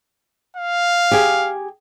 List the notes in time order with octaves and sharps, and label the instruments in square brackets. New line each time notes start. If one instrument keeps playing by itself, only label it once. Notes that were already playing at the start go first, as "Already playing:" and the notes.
[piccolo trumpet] F5
[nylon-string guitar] G4 G#4